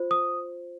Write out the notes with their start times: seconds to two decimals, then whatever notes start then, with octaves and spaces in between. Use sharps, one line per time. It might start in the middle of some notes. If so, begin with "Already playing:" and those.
Already playing: F4 C5
0.11 D#6